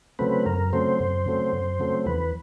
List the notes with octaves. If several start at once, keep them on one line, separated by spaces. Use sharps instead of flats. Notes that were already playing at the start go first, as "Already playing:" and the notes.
C#3 F#3 A3 C4 B4
F#2 A#4
C#3 F#3 A3 C4 C5
F#2 C5
C#3 F#3 A3 C4
F#2
C#3 F#3 A3 C4
E2 B4